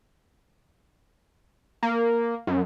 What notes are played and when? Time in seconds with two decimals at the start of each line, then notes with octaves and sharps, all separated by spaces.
1.83 A#3
2.47 F#2